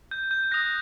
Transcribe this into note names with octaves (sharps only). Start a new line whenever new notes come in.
G6
G6
D#6 F#6 A#6